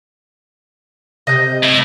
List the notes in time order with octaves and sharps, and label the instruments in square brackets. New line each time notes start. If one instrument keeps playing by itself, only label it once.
[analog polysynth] C3 [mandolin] D#5 G6
[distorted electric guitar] A3 E4